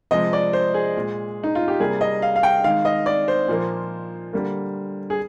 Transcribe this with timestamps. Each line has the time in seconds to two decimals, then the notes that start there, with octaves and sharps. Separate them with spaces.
0.11 C3 F3 G#3 D#5
0.33 D5
0.53 C5
0.74 G#4
0.96 A#2 G#3
1.44 D#4
1.55 F4
1.68 G4
1.80 C3 G3 A#3 G#4
2.01 D#5
2.22 F5
2.36 F5
2.43 G5
2.64 D#3 G#3 F5
2.85 D#5
3.06 D5
3.28 C5
3.48 A#2 F3 A#3
4.33 D3 G3 A#3
5.10 G#4